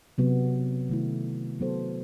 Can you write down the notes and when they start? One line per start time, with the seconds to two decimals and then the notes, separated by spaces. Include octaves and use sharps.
0.18 C3 F#3 B3 F#4
0.89 D#3 A3 E4
1.60 F#3 B3 F#4 A4 C5